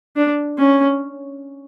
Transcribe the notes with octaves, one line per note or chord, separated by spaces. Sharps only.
D4
C#4